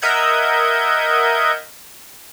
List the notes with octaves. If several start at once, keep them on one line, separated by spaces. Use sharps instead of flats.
A#4 D#5 E5 F#5 G6 G#6